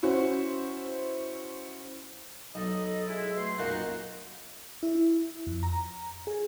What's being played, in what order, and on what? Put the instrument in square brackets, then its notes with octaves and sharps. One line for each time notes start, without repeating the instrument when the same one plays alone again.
[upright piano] C#4 E4 F#4 C5
[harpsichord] B1 [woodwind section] D#4 A4 D#5
[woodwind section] G#3 E4
B2 A3 C6
[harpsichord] B1 F#2 A#2 [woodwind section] D#4 F#4
[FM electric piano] E4
F2
A#5
G#4